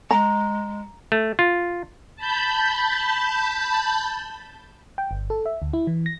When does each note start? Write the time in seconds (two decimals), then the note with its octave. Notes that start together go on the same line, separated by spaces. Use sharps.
0.11 G#3 A#5
1.12 A3
1.39 F4
2.16 A5 B5 G6
4.98 G5
5.11 G1
5.30 A4
5.46 E5
5.62 D2
5.73 E4
5.87 E3
6.06 A#6